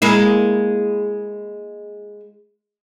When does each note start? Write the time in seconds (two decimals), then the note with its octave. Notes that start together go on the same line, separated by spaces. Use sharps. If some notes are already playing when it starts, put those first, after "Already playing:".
0.02 G#3 A#3 E4